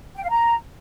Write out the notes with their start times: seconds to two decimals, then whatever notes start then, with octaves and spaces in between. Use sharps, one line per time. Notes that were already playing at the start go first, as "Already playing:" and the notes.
0.16 G5
0.23 F5
0.29 A#5